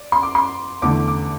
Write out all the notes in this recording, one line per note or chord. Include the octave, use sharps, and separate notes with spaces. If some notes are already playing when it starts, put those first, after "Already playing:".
Already playing: D5
C6
D6
C6
E2 D3 A3 D6
D6